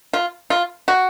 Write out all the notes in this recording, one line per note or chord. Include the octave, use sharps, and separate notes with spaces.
F4
F4
F#4